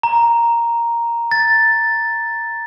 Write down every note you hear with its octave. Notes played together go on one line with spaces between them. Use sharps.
A#5
A6